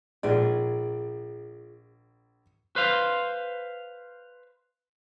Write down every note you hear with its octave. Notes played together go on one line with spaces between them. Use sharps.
A#1 G#2 F4 G#4 D5
B4 C5 F5